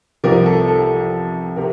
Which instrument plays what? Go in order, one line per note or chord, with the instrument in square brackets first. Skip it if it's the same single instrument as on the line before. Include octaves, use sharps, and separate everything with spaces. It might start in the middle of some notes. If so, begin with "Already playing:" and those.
[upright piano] C2 C3 F3 A#4
A4
A4
C3 A#4